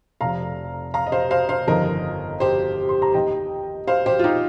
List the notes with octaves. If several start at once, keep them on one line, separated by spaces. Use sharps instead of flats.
F1 F2 C3 F5 A#5
F5 A#5
D#5
C5 F5
C5 F5
C5 F5
G1 F2 D#3 A#4 D#5
G4 C5
C6
A#5
D#2 D#3 D#5 G5
C5 F5
G4 C5
F4
D#4 G4